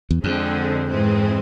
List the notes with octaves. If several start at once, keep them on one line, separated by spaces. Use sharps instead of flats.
E2
F2 D3 G#3 C4
G#2 E3 G#3 C4